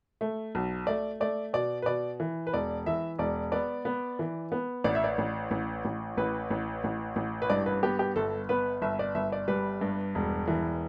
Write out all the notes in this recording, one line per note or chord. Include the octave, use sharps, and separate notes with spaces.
A3
B1
A3 D5
A3 D5
B2 D5
B4
B2 D5
E3
B4
E1 D5
E3 E5
E1 D5
B3 D5
B3
E3
B3
A1 D5
E5
D5
A1
A1
A1
A1 B4
A1
A1
A1
B4
G2 D5
B4
B3 G4
G4
G1 A4
B3 B4
G1 E5
D5
G1 E5
D5
G3 B4
G2
E1
E3